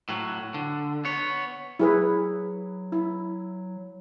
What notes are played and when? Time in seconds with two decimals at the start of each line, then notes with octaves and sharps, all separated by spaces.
0.09 A2 F#3
0.54 D3
1.05 B3 C#5
1.79 F#3 E4 G#4 B4
2.92 E4